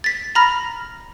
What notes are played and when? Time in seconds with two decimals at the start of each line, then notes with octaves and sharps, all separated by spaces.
0.04 A6 B6
0.35 A#5 B5 F6 A#6